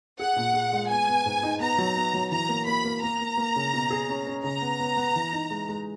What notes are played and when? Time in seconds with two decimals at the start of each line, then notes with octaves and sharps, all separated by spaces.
0.20 G#4 F#5
0.36 A#2
0.54 G#4
0.72 G#3
0.90 B3 G#5
1.08 B3
1.26 G#2
1.43 D#4
1.60 B3 A#5
1.78 F#3
1.97 B3
2.14 F#3
2.31 E3 A#5
2.49 A#3
2.67 A#3 B5
2.84 A#3
3.02 A#3 A#5
3.21 A#3
3.37 A#3
3.56 C#3
3.74 B2
3.90 G#4
4.09 C#4
4.27 C#4
4.44 C#3 A#5
4.62 B3
4.79 B3
4.97 B3
5.16 E3
5.33 D#4
5.50 G#3
5.69 G#3